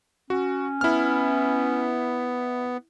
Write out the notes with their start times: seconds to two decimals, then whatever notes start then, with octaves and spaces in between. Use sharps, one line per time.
0.30 C#4 F#4
0.81 B3 E4 F6